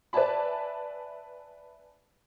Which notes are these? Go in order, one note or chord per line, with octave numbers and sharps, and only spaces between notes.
B4 D5 E5 G#5 A5 B5